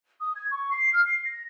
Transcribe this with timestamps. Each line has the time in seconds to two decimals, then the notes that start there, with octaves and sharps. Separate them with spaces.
0.20 D#6
0.35 G#6
0.51 C#6
0.71 C7
0.93 F6
1.06 C7
1.25 A#6